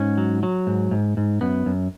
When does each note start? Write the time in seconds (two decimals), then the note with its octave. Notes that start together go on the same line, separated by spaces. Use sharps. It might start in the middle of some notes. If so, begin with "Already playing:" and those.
Already playing: G#2 C#4
0.18 F#3
0.43 F#3
0.67 G#2
0.91 G#2
1.17 G#2
1.41 F#2 B3
1.66 F#2